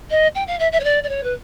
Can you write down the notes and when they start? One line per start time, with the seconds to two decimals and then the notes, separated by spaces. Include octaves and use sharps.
0.10 D#5
0.35 G5
0.47 F5
0.59 E5
0.72 E5
0.80 C#5
0.84 D5
1.03 D5
1.09 C#5
1.23 B4